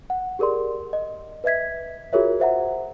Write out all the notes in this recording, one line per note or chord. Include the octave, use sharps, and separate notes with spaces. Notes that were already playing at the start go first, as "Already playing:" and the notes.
F#5
G4 G#4 A#4 D5 C6
D#5
B4 D#5 E5 G#6 B6
F4 F#4 G#4 A#4 C#5 E5
C5 E5 F#5 A#5